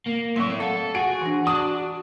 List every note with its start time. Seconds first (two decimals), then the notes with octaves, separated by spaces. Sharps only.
0.07 A#3
0.36 A2 F#3 C4 E5 C6
0.60 A4 F5 F#5
0.95 F#4 G#4 D7
1.22 E3 D4
1.47 D4 A5 D#6